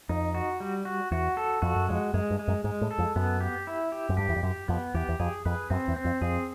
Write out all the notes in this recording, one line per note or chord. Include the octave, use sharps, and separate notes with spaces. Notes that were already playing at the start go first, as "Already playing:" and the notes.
F2 D#4
F#4
G3
F#4
E2 F#4
A4
F2 F#4
F#2
F2 G#3
F#2 G#3
G2
G#3
F#2
G#2 G#3
A2
A4
F2
F#2 B3
G4
E4
G4
F#2
G2 G4
E2
F2
F#2 G4
F2 B3
E2 G4
E2
F2 G#4
F2 B4
F#2 C4
E2
C4
F2
F2 G#4